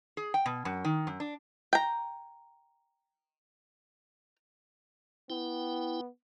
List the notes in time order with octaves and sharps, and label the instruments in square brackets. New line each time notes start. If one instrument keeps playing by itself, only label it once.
[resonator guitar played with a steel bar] G#4
G5
B2
F#2
D#3
F#2
D4
[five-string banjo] G5 A#5
[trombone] B3 [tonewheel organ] E4 G5